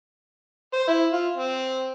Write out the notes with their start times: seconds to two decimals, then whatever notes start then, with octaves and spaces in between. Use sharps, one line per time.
0.73 C5
0.88 E4
1.13 F4
1.37 C4